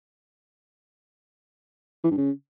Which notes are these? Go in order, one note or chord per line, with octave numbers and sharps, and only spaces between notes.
E3
G2
C#3